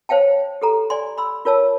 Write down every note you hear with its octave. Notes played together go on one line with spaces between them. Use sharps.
C5 C#5 F5 G5 A5
G4 A4 A#5
D5 G#5 C6
B5 C6 E6
F4 A#4 C#5 A5 E6